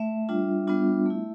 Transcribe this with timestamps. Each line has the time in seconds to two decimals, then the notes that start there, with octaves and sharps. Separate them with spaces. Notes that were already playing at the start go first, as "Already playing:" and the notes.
Already playing: A3 E5
0.29 G3 D4 F4
0.67 G3 B3 D4 F4
1.06 A3 E4